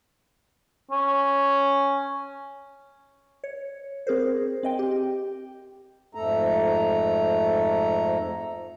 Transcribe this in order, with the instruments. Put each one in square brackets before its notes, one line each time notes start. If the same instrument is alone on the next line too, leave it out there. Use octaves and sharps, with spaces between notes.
[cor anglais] C#4
[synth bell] C#5
C4 G#4 A#4 C5
C4 D#5 G5
G4
[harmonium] F2 G#2 A3 A4 A#5